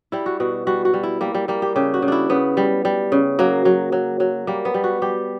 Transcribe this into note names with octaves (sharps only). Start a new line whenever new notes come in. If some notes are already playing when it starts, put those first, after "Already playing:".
G3 E4
F#4
B2 F#4
G3 F#4
F#4
G3
E4
G3 A#3
G3
G3 A#3
G4
C#3 G4
F#4
C#3
D4 E4
C#3 B3
G3
G3
C#3
F#3 A#3
F#3
F#3
F#3
G3 A#3
B3
G3
F#4
G3 G4